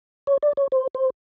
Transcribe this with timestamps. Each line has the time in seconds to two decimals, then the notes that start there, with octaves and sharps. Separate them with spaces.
0.27 C#5
0.43 D5
0.57 C#5
0.72 C5
0.95 C5